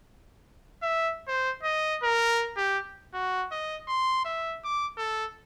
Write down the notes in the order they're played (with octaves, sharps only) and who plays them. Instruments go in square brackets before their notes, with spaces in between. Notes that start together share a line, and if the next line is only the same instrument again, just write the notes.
[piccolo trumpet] E5
C5
D#5
A#4
G4
F#4
D#5
C6
E5
D6
A4